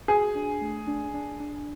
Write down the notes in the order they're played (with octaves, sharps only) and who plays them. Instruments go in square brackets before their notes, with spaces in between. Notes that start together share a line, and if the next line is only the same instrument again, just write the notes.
[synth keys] F#4 [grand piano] G#4
[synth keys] D4
A3
D4
D4
D4